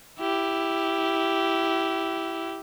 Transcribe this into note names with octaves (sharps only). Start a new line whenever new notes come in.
E4 G4